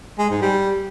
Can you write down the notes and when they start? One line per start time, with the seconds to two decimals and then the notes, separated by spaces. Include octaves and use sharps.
0.19 G#3
0.30 G#2
0.42 G3